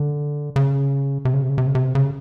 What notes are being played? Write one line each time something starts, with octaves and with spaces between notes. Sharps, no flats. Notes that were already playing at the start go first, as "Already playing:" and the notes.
Already playing: D3
C#3
C3
C#3
C3
C#3
C3
C#3
C3
C#3